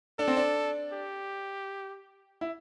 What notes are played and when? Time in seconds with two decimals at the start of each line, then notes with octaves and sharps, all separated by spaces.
0.19 D4 A4
0.28 C4
0.37 D4
0.92 G4
2.41 E4